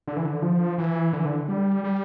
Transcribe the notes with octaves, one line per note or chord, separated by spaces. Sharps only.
D3
E3
D3
F3
E3
D3
E3
D3
G3
G3